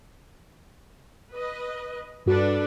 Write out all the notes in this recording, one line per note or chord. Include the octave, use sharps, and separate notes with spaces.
B4 D#5
G2 D4 F#4 A4 B4